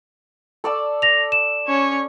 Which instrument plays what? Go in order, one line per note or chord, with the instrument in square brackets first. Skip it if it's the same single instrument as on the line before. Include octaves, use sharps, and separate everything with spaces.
[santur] A4 D5 E6
[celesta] A#6 F7
E7
[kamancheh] C#4 C#5